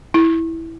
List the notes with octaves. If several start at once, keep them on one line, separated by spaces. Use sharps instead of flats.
E4